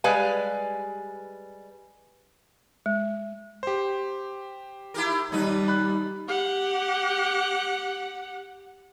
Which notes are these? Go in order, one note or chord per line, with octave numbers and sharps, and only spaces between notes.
G3 G#3 B4 F5 G#5
G#3
G4 C5
E4 G4 A#4
D#2 G3 D#4 B4
B5 F#6
G4 F#5